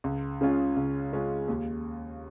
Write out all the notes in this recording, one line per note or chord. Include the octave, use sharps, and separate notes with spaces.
C#2
C#3 G#3 C#4 F4
C#2
C#3 G#3 C#4 F4
D#2